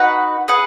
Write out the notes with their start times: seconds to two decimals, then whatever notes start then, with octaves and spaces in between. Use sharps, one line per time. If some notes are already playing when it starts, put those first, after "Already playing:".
Already playing: D#4 F#4 B4 F#5
0.48 G#4 B4 F#5